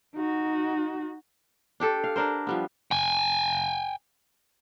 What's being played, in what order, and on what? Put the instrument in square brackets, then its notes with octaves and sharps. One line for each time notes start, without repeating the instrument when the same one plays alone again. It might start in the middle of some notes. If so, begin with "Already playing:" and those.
[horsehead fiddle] D#4 F#4
[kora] D4 G4 A4
F5
D4 A#4 C5
F3 G3 B3
[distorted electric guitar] G5 G#5